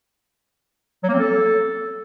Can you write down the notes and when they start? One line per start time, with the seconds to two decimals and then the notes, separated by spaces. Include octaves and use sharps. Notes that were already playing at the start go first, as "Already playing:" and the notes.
1.04 F#3
1.09 A#3
1.14 C4
1.19 A4